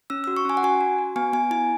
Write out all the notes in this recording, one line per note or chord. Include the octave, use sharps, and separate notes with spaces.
C#4 E6
E6
F#4
C#6
C#4 G#5
F#5
F#4 G#5
F#4
F#4
B3 G#5
B3 G#5
E4 G#5